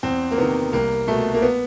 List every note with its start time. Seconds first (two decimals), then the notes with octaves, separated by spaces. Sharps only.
0.03 E2 C4
0.31 A#3
0.38 C3 D#3 B3
0.73 C2 A#3
1.07 B2 A3
1.34 A#3
1.42 B3